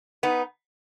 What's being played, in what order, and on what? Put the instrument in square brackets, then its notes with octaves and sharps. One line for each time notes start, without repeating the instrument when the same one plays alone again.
[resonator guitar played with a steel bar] B3 D#4